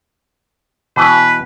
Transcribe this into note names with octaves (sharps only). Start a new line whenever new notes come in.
B2 E3 B4